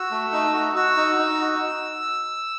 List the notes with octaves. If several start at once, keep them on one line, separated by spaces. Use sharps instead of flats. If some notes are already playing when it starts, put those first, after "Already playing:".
Already playing: F#4 E6
A3
D#4
F#4
F#4 E6
D#4
D#4
F#4